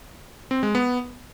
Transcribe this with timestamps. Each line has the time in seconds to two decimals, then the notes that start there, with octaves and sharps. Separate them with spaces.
0.51 C4
0.63 G#3
0.75 B3